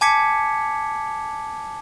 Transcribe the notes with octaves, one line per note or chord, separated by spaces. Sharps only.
G#5 A5 D6 G#6 B6 C#7